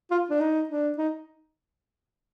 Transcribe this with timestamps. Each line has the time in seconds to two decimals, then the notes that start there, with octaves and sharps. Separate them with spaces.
0.11 F4
0.30 D4
0.40 D#4
0.69 D4
0.98 D#4